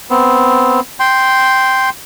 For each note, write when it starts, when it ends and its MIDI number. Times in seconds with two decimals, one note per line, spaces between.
0.10 0.80 59
0.10 0.80 60
1.00 1.90 79
1.00 1.90 84